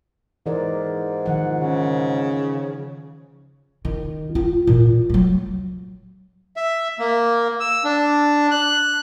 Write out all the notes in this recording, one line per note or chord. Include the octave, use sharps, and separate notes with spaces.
G#2 E3 A#4 D5
D#3 F3 F#5
C#3
D#3
F4
A#2 E3
F#3 A3
E5
A#3
E6
D4
F#6